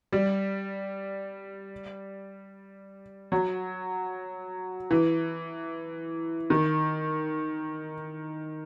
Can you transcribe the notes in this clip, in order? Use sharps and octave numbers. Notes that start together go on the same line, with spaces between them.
G3
F#3
E3
D#3